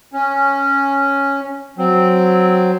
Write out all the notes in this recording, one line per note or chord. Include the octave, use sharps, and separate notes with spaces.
C#4
F#3 C4